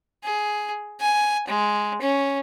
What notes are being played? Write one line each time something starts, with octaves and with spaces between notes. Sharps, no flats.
G#4
G#5
G#3
C#4